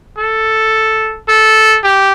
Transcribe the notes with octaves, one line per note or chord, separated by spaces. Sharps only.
A4
A4
G4